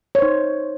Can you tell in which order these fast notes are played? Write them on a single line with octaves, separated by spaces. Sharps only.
C#5 C5 D#4